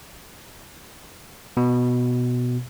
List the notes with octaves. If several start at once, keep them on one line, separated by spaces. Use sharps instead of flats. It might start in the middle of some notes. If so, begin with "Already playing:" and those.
B2